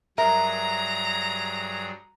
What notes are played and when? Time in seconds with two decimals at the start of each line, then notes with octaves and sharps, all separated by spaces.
0.18 G2 F#3 G#4 A#4 E5 A#5